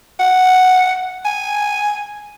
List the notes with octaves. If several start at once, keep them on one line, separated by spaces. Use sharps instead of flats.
F#5
G#5